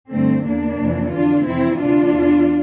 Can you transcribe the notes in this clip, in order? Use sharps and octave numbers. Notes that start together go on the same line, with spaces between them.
G2 D3 A3 C4
E2 D3 A#3 D4
F2 C3 E3
F2 D3 D4 F4
F2 C3 E3 C4 E4
D2 C3 E3 D4 F4
E2 E3